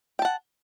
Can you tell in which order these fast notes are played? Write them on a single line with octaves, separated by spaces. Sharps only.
G5 A5 F#5